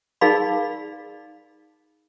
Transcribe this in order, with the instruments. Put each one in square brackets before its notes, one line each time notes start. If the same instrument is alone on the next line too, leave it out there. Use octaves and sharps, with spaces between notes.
[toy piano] D#4 G#4 A#4 D5 F5 B5